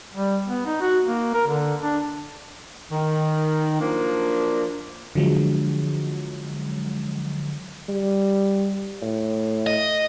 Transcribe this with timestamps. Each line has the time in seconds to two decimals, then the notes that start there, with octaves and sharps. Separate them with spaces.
0.14 G3
0.47 B3
0.66 D#4
0.81 F#4
1.04 A#3
1.34 A#4
1.47 D3
1.81 D4
2.92 D#3
3.80 F3 F#3 A#3 D4
5.15 D3 F3 F#3 G#3
7.89 G3
9.02 A2
9.67 D#5